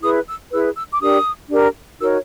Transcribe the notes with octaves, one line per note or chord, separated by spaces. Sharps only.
E4 G#4 B4 D#6
E6
E4 G#4 B4 E6
E6
D6
D4 G4 A#4 D#6
D4 G4 A#4
D#4 F#4 A#4 C#5 E6